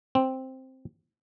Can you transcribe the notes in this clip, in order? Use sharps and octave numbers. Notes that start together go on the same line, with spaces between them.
C4